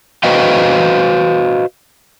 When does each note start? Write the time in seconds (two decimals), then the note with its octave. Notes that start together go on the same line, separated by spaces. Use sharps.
0.23 F#4 B4 C5 D#5 F5 G5